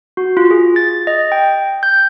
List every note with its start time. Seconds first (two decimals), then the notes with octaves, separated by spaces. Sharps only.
0.17 F#4
0.37 F4
0.51 G#4
0.76 A6
1.07 D#5
1.32 G5
1.83 G6